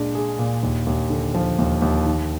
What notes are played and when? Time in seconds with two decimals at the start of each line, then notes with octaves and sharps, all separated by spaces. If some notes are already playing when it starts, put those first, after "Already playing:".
Already playing: A#2 G#3 D4
0.15 G#4
0.39 A#2
0.63 D#2
0.87 D#2
1.10 D3
1.34 F3
1.59 D#2
1.82 D#2
2.06 D#3